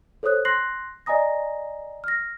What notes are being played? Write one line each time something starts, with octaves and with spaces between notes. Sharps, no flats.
A4 C5 C#5 D#6 F#6
C6 F#6 A#6 C7 F#7
D5 D#5 G#5 A#5 D#6 A#6
F6 A#6